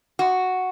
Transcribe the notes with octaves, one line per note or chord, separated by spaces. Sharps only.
F#4